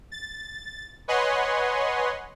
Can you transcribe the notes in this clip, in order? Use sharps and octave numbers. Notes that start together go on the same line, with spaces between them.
A6
B4 C#5 D#5 F#5 G#5 C6